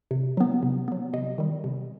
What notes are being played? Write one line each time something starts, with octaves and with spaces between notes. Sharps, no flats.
C3
F#3 B3
C3
F#3 B3
C3 D#5
D#3 G3
C3